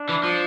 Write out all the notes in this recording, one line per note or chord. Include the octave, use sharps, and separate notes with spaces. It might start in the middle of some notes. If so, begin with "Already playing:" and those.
Already playing: D4
E3
F3